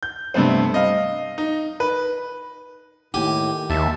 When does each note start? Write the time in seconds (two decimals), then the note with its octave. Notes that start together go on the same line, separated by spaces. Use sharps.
0.03 G6
0.34 G2 C3 A3 B3 C4
0.74 D#5 F5
1.38 D#4
1.80 B4
3.14 A2 D#3 A#3 D#4 G4 G#5
3.70 D#2 E5 A5